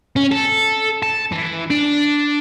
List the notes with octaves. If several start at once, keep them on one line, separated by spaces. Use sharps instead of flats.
C#4
A4
A5
E3
D4